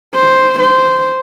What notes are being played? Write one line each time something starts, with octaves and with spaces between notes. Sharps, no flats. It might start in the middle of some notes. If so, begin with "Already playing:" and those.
C5
C5